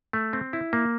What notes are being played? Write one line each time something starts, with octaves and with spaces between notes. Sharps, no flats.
A3
C4
E4
A#3